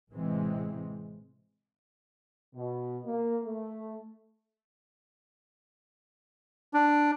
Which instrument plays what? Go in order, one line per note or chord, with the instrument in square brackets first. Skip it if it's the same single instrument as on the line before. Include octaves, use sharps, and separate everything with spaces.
[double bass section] A1 C3 E3 G#3 C4
[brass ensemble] B2
A#3
A3
[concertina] D4